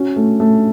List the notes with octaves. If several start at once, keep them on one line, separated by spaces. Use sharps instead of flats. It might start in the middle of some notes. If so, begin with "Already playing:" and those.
Already playing: C#4 F#4
A3
A3